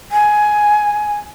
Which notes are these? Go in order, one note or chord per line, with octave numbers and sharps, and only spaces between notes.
G#5